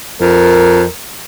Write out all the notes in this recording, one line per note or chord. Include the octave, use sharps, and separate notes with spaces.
F2 A#4